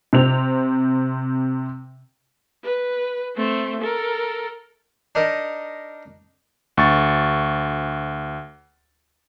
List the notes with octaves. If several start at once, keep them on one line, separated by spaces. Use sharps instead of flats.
C3 C4 F7
B4
A3 C4
A4 A#4
D4 D#4 A#4 D#5
D2 C#6 A6